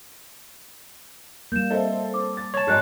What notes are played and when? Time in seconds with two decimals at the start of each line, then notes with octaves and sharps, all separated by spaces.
1.52 G3 A#3 G6 E7
1.70 C4 A4 D#5 E5
2.14 D6
2.37 A6
2.54 C#5 A5
2.67 G#1 G#3 G#4 F6 F#6